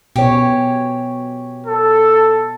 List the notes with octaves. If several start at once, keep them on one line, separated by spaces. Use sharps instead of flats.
B2 G4 C#5
A4